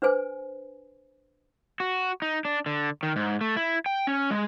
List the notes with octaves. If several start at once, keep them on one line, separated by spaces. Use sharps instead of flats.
D4 B4 C5 G#5
F#4
D#4
D4
D3
D#3
G#2
A3
E4
G5
C#4
G#3